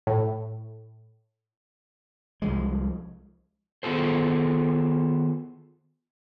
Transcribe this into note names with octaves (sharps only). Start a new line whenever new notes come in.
A2
C2 F3 G#3
D#3 B3 F4 G#4 A4 C5